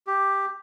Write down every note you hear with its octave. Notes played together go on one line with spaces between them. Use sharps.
G4